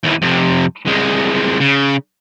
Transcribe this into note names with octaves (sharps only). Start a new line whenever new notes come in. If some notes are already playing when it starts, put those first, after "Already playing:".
D#2 E3
F2 C3
C2 G#3
C#3